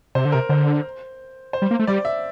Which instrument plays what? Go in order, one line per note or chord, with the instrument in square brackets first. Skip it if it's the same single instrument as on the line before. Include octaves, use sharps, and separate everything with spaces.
[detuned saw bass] C3 [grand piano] C5
[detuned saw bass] D3
[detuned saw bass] C3 [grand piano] A#4
[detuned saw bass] D3 [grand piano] C5
[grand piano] C5
[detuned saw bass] G3
A#3
A3
[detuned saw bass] G3 [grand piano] D5
[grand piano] E5